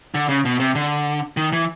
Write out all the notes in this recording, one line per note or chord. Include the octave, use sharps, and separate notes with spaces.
D3
C#3
B2
C3
D3
D#3
E3